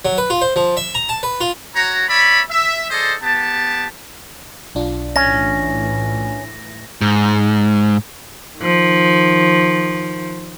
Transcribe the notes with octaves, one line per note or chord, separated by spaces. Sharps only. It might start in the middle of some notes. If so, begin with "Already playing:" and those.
F#3
B4
F4
C5
F3
E5
A#5
A5
B4
F4
F#4 C#5 A#5
C#5 D5 E5 B5
E5
G#4 A4 C5 D5 D#5
B3 G4 A5
B1 D4 F4
A2 E3 C#4 A#6
G#2
D#3 F3